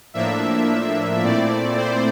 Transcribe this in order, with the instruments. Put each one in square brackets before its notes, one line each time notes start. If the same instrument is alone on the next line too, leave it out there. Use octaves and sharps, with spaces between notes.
[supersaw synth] A2 F3 A#3 D4 E5
A#2 A3 C4 E4 D5
C5